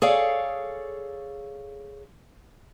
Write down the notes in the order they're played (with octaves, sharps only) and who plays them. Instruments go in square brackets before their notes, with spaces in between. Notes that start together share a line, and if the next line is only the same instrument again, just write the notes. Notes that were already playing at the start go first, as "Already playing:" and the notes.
[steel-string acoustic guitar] G#4 A4 C#5 D5 F5